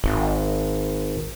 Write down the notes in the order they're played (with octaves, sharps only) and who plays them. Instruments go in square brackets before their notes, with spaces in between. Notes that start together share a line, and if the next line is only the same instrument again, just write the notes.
[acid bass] G#1